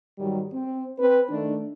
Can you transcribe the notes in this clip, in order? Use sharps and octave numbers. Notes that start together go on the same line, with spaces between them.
G#2 D#3 F#3 G3
C4
C4 B4
D#3 A3 D4